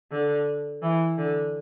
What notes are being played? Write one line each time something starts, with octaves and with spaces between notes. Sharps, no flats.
D3
E3
D3